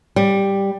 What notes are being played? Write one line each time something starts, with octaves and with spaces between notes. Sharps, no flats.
G3